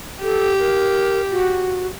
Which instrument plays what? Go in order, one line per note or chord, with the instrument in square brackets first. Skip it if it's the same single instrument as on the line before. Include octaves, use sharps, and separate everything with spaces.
[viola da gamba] G4 [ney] A4
[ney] A#4
F#4